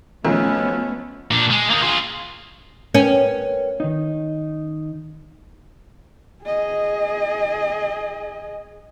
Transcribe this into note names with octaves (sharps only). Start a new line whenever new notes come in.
B1 F3 A3 B3 C#4
A#2 D4
G#3
A#3 D#4
F4 G#4
C#4 A#4 B4 G5
D#3 D#4
G#4 D#5